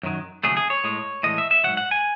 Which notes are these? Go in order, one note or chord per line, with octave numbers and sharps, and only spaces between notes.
F#2 D#3 F#3
D#2 C#3 F#3 A3 G#4
G#4
C#5
A2 G#3
A2 E3 G#3 D#5
E5
E5
G#2 D#3 F#3 F#5
F#5
G#5